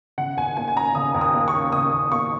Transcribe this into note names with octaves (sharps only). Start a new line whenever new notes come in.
C#3 F#5
D#2 G#5
A#3 G#5
G#5
C#4 A#5
C#3 D#6
D#2
D#6
A#3
C#6
C#4
C#3 D#6
D#2
A#3 C#6